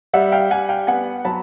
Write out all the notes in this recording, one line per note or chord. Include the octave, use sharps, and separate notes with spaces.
G3 E5 F#5
F5 G5
G3 F#5 G#5
F5 G5
B3 F#5 G#5
F#3 A5 B5